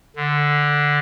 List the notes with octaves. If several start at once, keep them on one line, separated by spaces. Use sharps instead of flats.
D3